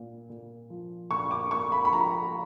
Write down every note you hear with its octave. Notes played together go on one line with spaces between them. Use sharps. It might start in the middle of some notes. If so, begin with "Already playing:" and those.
Already playing: A#2
A#2
F3
A#2 C#6
D6
A#3 C#6
B5
B5
F3 A#5